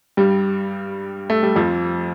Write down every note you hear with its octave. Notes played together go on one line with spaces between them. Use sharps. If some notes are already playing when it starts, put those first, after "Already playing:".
G2 G3
A3
G3
F2 F3